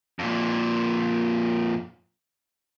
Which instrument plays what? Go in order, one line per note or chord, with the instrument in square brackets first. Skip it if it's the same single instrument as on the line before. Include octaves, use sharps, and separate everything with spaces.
[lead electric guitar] F2 A#2